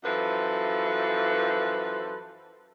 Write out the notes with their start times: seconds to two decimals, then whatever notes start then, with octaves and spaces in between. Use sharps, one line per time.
0.04 F#2 E3 F3 A4 B4